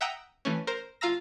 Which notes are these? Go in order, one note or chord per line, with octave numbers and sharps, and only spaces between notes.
E5 F#5 G5 A#5 D#6 E6
E3 A3 C#4
A#4 C5
G1 F4 F5 A#5 E6 A#6